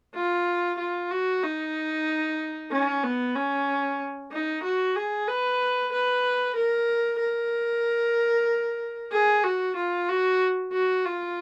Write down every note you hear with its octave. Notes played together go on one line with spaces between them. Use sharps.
F4
F4
F#4
D#4
C#4
B3
C#4
D#4
F#4
G#4
B4
B4
A#4
A#4
G#4
F#4
F4
F#4
F#4
F4